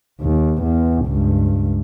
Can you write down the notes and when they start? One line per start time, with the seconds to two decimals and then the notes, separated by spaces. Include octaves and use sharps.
0.21 D#2
0.63 E2
1.06 C#2 G2